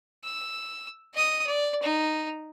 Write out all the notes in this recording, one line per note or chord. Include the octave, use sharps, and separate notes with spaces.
E6
D#5 D#6
D5
D#4